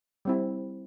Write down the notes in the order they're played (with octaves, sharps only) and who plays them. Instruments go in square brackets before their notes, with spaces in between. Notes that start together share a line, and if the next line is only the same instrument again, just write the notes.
[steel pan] G3 C4 E4